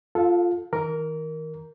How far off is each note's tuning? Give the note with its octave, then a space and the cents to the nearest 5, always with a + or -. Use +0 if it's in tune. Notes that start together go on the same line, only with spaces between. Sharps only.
F4 +0 A4 -5 F5 +35
D#3 +40 A#4 +0 D6 -40